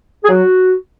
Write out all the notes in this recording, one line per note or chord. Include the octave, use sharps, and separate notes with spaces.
G#4
F#3 F#4